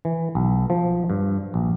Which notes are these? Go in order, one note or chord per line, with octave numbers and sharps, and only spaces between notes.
E3
B1
F3
G2
A#1